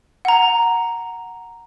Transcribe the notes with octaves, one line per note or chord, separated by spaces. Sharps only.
F#5 A#5